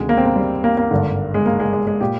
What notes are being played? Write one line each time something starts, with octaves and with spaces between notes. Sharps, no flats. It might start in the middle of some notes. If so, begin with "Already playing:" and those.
Already playing: D2 C3 D#3 G#3
A#3
C4
A#3
G3
A#3
A#3
G#1 G2 D3
G#3
A#3
G#3
G#3
G#3
A#2 G4